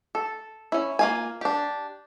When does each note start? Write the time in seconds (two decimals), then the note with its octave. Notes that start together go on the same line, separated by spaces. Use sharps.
0.15 A4
0.72 C#4 E4
0.99 A#3 F4 G#5
1.41 D4 G4